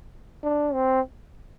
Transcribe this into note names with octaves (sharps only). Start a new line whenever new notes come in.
D4
C4